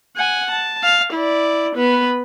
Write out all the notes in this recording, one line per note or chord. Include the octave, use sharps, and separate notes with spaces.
F#5 G#5
A5
F5
E4 D5
B3 B4